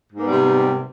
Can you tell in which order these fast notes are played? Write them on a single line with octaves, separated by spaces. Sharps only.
G#2 A#3 B3 G3 C3